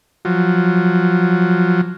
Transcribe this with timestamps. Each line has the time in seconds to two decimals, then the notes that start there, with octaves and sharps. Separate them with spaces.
0.25 F3 F#3